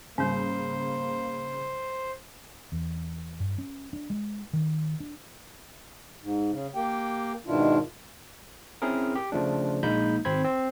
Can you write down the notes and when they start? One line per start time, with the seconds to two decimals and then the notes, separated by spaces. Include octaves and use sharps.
0.18 G#2 C#3 G3 A#3 C5
2.72 E2
3.40 G2
3.58 C#4
3.93 D4
4.10 G#3
4.53 D#3
5.00 D4
6.22 G#2
6.51 C#3
6.75 A#3 G4 G5
7.47 G#2 B2 D#3 D4 E4 F4
8.82 C4 C#4 E4 G#4 A#4
9.15 G4
9.32 C#3 F3 A3 D4
9.83 A#1 G#3 A#3 D#4 B5 G6
10.25 G#1 C4 C5 B5 G#6
10.44 C4